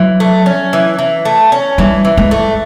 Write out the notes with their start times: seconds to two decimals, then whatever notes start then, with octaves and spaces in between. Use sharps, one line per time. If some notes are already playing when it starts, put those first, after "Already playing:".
Already playing: E3 F#3
0.20 A3
0.46 C#4
0.73 E3
0.99 E3
1.25 A3
1.52 C#4
1.78 E3 G3
2.05 E3
2.17 G#3
2.31 A3